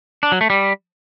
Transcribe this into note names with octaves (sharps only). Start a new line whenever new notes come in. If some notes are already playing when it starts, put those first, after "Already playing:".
D4
F#3
A3
G3